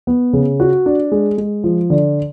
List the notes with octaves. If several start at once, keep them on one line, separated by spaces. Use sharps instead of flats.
B3
C#3
F#4
D4
G#3
G#3
F3
D3